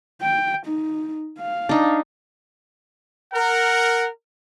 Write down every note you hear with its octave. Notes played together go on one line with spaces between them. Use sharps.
G5
D#4
F5
D4 D#4
A#4 F#5